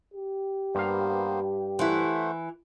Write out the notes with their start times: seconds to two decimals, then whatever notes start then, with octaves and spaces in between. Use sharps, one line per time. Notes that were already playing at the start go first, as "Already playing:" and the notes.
0.14 G4
0.75 G2 A#3 B3 C5 F5
1.79 E3 A3 E4 C5 F#5